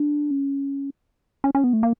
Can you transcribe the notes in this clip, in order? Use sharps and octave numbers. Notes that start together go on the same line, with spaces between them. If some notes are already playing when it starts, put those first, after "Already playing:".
Already playing: D4
C#4
C#4
C#4
B3
A3
A#3